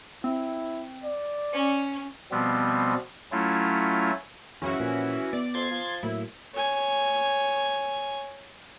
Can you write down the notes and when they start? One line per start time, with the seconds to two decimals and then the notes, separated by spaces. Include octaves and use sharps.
0.24 C4 E4
1.04 D5
1.53 C#4 C#7
2.31 B2 F3 G3 B3 C4
3.32 F#3 A3 C#4 E4 F4
4.62 F#2 C#3 E3 C#4 E4 F#4
4.80 A#2 E3 F3
5.33 B3 D5
5.54 F2 C6 G#6 A6
5.71 F3
6.03 A2 F#3 A#3 E4
6.54 C#5 G#5